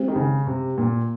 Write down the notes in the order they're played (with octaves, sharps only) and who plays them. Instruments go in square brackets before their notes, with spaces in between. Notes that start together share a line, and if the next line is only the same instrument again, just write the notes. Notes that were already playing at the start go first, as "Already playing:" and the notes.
Already playing: [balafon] G#3 C4 G4 C5
[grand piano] D#3
C#3
C3
A#2